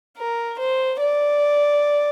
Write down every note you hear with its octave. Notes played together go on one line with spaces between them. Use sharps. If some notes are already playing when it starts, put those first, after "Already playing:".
A#4
C5
D5